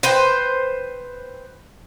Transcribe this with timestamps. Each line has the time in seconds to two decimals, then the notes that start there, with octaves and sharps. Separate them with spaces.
0.03 B4 C5 G5